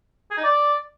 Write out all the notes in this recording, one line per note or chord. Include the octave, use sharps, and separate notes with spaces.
G#4
D#4
D5